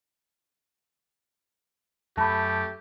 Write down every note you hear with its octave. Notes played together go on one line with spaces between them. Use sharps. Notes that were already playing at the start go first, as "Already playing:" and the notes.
F#2 A3 G4 A5 B5